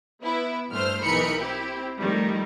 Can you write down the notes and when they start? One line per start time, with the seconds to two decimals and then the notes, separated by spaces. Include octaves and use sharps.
0.22 B3 E4
0.70 G2 A3 C5 F6
1.03 B1 E3 D#4 A#4 B5 C#7
1.39 C4 E4 G4
1.99 F2 D#3 G3 A3